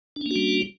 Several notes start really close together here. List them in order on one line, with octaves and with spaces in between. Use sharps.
D4 C#4 A#3 F#4 G3